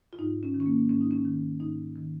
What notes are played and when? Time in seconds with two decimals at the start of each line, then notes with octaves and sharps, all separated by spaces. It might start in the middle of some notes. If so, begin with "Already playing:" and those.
0.13 F4
0.18 G#2 D#4
0.43 C#4
0.54 D#3
0.60 C#4
0.66 A#3
0.89 G#2 C#4
1.01 D#4
1.11 C#4
1.25 D#3
1.60 G#2 D#4
1.96 D#3